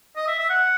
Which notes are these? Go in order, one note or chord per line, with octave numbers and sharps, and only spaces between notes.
D#5
E5
E5
F#5